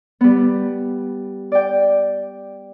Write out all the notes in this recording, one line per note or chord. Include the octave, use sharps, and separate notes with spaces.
G3 B3
D5 G5